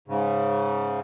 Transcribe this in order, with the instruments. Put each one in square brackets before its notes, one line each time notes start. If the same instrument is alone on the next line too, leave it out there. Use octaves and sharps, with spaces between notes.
[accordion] G#2 C#3